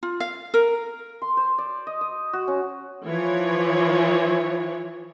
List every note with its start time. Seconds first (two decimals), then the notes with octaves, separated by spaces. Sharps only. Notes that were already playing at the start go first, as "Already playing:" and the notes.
0.03 F4
0.20 F5
0.54 A#4
1.22 C6
1.37 C5
1.58 D5
1.87 D#5
2.01 D#5
2.33 F#4
2.48 C#4
3.06 E3 F3 C#5